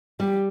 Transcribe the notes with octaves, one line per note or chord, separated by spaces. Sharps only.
G3 G4